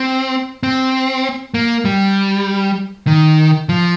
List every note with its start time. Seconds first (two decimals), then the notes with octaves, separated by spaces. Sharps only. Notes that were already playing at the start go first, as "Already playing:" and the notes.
Already playing: C4
0.63 C4
1.54 A#3
1.85 G3
3.07 D#3
3.69 F3